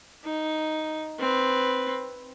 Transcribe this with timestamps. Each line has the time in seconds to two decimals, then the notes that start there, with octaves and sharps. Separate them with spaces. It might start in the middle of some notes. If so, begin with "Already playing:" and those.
0.25 D#4
1.19 C4 B4